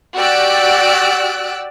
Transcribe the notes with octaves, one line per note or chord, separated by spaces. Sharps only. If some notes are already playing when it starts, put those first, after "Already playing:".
F#4 G4 D5 E6 F#6 D7